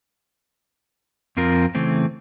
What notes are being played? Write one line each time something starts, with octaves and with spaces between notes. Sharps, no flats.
F2 C4 F4 A#4
C#3 E3 A3 C4